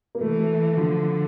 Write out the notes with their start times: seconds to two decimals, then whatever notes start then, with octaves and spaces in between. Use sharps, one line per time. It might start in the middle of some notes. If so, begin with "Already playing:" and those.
0.15 A#3
0.21 E3 A3
0.39 A3
0.77 D3 F3